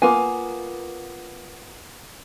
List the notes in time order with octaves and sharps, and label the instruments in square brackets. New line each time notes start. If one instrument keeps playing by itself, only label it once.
[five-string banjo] A#3 B3 F4 B4 G#5